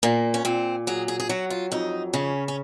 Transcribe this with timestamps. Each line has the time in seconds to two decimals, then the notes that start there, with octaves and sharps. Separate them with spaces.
0.03 A#2 A#3
0.34 C#4
0.45 A#2 C4
0.87 F#3 G#4
1.08 G#4
1.20 G#4
1.29 F#3 F#4
1.50 F4
1.72 F2 D#4
2.14 C#3 C#4
2.48 C#4